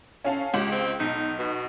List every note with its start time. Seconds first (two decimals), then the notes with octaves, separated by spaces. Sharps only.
0.25 A2 C#4 F5 A5
0.54 C#2 G4 F#7
0.72 C4
1.00 B1 D#4
1.39 B2